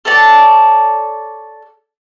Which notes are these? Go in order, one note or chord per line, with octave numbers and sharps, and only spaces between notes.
A4 C#5 D5 A5